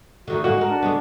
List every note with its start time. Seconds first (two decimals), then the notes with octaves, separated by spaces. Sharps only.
0.27 D3 D#3 A3 F#4
0.44 D3 G#3 A#3 F#4
0.57 D#4 A#4
0.69 D4
0.82 D3 G#3 B3